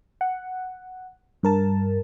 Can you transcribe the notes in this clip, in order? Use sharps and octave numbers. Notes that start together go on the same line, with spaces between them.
F#5
G2 A#4 A5